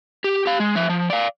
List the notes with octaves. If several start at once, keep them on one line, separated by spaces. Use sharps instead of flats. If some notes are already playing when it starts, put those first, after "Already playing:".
G4
G4 F5
G#3
F3 E5
F3
D5 F5